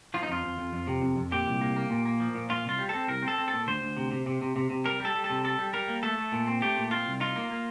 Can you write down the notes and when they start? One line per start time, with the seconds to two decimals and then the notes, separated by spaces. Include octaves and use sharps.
0.14 F3 F4
0.23 D#4
0.28 F2 F4
0.44 F2
0.58 F2
0.73 F2
0.87 C3
1.02 F2
1.16 F2
1.31 A#2 G4
1.47 C2
1.61 A#3
1.76 A#3
1.90 A#2
2.05 A#3
2.20 F3
2.35 A#2
2.49 A#2 F4
2.64 C2 F4
2.78 G3
2.89 C4 A4
3.08 C2 A#4
3.23 C4
3.28 A4
3.38 C4
3.48 A4
3.53 A#2
3.67 D2 C5
3.82 D2
3.97 C3
4.11 C3
4.26 C3
4.41 C3
4.56 C3
4.70 C3
4.85 G3 A#4
5.00 G3
5.05 A4
5.15 G3
5.24 A4
5.30 C3
5.44 G3 A4
5.59 G3
5.73 G3 A#4
5.88 A#3
6.03 A3 A4
6.18 A3
6.32 A#2
6.47 C4
6.62 A3 G4
6.76 A#2
6.91 C4 F4
7.06 C2
7.20 D#4 F4
7.36 A#3
7.51 A#3